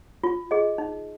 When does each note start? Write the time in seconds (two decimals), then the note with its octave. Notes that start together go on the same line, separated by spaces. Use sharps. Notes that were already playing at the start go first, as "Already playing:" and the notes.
0.24 F4
0.51 G#4 D#5
0.78 D#4